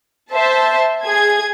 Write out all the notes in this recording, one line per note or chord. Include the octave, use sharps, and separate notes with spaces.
C5 E5 A5
G#4 G#6